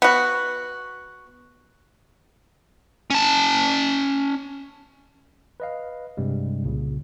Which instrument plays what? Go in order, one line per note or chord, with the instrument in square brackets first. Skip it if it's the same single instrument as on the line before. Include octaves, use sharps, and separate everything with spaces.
[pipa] B3 F#4
[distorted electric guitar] C#4 A5
[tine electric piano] B4 D#5 F5
G2 C3 G3 G#3
C2 A#2 C#3